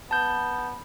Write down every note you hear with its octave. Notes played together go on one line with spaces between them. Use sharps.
B3 A5 G6